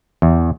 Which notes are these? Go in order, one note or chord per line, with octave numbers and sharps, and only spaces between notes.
E2